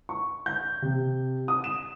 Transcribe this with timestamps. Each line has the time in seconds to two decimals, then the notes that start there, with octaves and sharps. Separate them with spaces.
0.09 C#6
0.46 G6
0.82 C3
1.48 D#6
1.64 E7